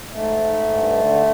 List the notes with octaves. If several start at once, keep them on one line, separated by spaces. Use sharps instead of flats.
G#2 A3
G#2
G2
D3